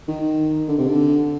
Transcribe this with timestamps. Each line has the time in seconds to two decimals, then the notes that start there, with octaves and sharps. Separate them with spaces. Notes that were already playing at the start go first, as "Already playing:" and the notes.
0.08 D#3
0.69 D3
0.79 C3
0.87 D3